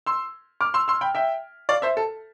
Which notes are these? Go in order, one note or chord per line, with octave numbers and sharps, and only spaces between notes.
C6 E6
D6 F6
C6 E6
C6 E6
G5 B5
E5 G5
D5 F5
C5 E5
A4